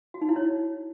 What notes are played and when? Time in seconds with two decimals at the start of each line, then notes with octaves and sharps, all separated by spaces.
0.14 F#4
0.21 D#4
0.29 E4
0.36 C#5